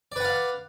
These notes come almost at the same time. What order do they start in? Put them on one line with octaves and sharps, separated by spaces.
D5 B4 F#5 F5